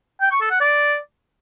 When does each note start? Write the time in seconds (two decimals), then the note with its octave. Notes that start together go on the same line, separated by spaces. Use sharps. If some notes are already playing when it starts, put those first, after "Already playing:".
0.21 G5
0.31 C#6
0.41 A4
0.51 F#5
0.60 D5